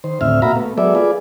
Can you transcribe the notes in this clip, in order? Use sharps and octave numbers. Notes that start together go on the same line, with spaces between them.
D#3 C5
D2 A2 C4 E5 F6
A#2 F#4 E5 F5 A#5 B5
A3 B3
F#3 G#3 B3 A4 D5 E5
F4 G#4 B4 D5